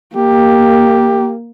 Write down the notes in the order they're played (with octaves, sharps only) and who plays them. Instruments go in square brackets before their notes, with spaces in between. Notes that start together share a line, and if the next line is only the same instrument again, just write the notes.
[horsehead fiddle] A#3 [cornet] G4